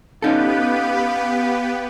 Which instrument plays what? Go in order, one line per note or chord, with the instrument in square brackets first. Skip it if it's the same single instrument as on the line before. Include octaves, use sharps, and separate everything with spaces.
[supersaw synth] B3 G4 B4 [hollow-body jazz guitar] C#4 D#4 A4 [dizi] F5